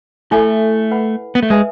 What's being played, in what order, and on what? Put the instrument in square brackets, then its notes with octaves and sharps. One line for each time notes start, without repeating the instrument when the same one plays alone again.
[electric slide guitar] A3 [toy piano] E4 A4 E5 G#5
[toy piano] B4 F#5 B5
[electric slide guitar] B3
A3
[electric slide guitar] G#3 [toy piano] B4 E5 G#5